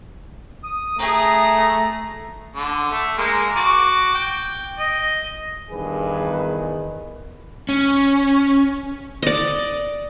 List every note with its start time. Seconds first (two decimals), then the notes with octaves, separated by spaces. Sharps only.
0.63 D#6
0.99 A3 G#4 A#5 D#6
2.56 D3
2.91 A3
3.18 G#3 A#3
3.56 F#4 D6
4.15 G5
4.79 D#5
5.70 E2 G2 D#3 G#4 B4
7.69 C#4
9.23 D5 D#5